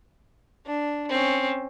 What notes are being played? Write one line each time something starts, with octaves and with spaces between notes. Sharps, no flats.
D4
C4 C#4